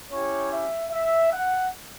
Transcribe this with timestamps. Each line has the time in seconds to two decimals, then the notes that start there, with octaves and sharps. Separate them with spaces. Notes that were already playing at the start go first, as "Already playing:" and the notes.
0.12 C#4 E4 G4 C#5
0.51 E5
0.91 E5
1.32 F#5